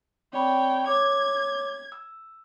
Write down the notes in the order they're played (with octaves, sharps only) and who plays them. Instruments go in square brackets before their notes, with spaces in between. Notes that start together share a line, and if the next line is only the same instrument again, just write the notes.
[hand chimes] C4 D5 B5 [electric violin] C#5 G5
[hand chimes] C#5 D6 [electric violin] G#6
[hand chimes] E6